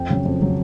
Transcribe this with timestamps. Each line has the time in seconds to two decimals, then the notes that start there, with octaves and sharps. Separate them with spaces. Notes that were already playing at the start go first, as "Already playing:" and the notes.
Already playing: F2 G5
0.10 C#3 F#3
0.25 F2
0.41 C#3 F#3